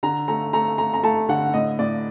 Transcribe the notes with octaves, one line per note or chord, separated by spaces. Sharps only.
D3 A#5
A3 A#5
A3 A#5
A3 A#5
A#5
A3 A5
D3 F#5
A2 D#5
A2 D5